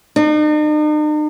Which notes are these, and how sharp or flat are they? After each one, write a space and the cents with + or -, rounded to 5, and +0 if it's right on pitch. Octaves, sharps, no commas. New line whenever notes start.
D#4 -45